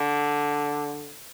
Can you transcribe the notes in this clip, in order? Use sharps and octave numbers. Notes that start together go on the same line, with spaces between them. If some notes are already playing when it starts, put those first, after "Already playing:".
Already playing: D3